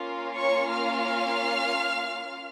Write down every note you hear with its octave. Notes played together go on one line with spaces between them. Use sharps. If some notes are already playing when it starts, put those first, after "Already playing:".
Already playing: A#3 C#4 F4
C#5 C#6
F5 F6